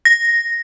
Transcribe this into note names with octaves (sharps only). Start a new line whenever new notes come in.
A#6